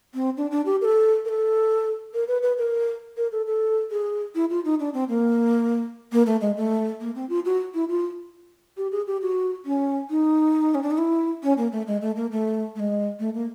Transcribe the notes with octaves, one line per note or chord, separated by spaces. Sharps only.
C4
D4
D4
G4
A#4
A4
A#4
A4
A#4
B4
B4
A#4
A#4
A4
A4
G#4
E4
F4
D#4
D4
C4
A#3
A#3
A3
G#3
A3
A#3
C4
F4
F#4
E4
F4
G4
G#4
G4
F#4
C#4
D#4
C#4
D4
D#4
E4
C#4
A#3
A3
G#3
A3
A#3
A3
A3
G#3
A3
A#3